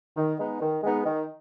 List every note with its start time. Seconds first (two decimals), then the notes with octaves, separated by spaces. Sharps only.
0.17 D#3
0.39 G#3 B3 D#4
0.62 D#3
0.84 G#3 B3 D#4
1.06 D#3